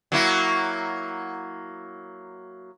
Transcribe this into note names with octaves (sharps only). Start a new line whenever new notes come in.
F#3 A#3 E4